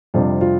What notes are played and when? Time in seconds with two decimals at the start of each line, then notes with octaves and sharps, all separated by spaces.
0.14 F2 C3 G3 D4 F4
0.41 F4